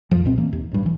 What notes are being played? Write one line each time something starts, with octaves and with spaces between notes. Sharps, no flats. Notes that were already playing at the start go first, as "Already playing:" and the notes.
F2 F3
C#2 B2 C4
E3 A#3
D#2
A1 G2
D1 E3